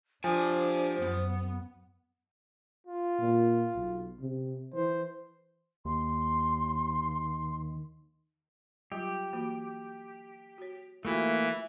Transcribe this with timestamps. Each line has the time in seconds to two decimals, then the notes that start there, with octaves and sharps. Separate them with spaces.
0.24 F3 D4 G4 C5 G#5
1.02 F#2 B3
2.87 F4
3.19 A#2
3.75 B1
4.20 C3
4.74 E3 C5
5.85 D#2 C6
8.92 F#3 G3 F4 G4
9.33 E3 A#3 F#4
10.58 F#4 C#5
11.05 E3 A3 A#3 F4 F#4 E5 G5